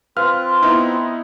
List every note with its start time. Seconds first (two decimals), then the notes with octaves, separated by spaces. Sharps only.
0.17 C4 F4 B4 F5 F6
0.62 B3 D#4 E4